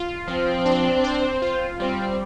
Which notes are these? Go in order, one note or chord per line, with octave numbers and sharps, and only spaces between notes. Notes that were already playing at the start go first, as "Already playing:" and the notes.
Already playing: F4
F3 C4
D4
C5
F4
G3 C4